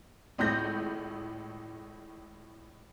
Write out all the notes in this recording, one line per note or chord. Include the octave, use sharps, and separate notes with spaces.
G#1 C#2 A2 A3 G6 A#6